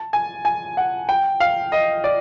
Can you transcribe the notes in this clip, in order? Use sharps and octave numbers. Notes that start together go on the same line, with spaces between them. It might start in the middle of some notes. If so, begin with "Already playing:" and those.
Already playing: A5
G#5
G#5
F#5
G5
F5
D#5
D5